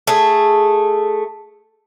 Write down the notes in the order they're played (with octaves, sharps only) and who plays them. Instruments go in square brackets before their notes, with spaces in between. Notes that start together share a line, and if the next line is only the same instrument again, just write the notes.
[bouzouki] A3 G#4